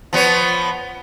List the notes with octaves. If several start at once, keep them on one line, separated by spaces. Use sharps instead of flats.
F3 B3 C#5